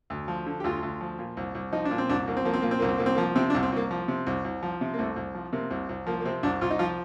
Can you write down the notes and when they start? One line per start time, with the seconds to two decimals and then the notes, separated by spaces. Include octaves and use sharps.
0.10 D2
0.28 F3
0.46 D3
0.60 G4
0.64 D2 F4
0.83 D2
1.01 F3
1.19 A#2
1.37 C2
1.55 C2
1.73 F3 D#4
1.85 D4
1.91 A#2
1.98 C4
2.09 C2 D4
2.27 C2 A#3
2.37 C4
2.45 F3 A#3
2.54 C4
2.62 A#2 A#3
2.71 C4
2.80 C2 A#3
2.89 C4
2.98 C2 A#3
3.06 C4
3.15 A#3
3.18 F3
3.36 C3 C4
3.50 D4
3.54 C2
3.63 C4
3.72 C2 A#3
3.91 F3
4.08 C3
4.27 C2
4.45 C2
4.63 F3
4.81 C3
4.94 A#3
4.98 C2 A3
5.16 C2
5.35 F3
5.53 C3 A#3
5.71 C2
5.89 C2
6.07 F3 A#3
6.20 A#3
6.25 C3 C4
6.43 C2 D4
6.61 C2 F4
6.70 D#4
6.79 F3 F4